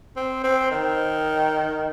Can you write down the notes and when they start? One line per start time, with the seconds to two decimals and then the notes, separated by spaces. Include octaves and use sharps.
0.16 C4
0.44 C4
0.71 D#3